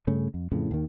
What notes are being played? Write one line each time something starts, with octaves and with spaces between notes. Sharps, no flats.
G2 C#3 A3 C#4
F2
F2 A2 C#3 E3
D#2 D#3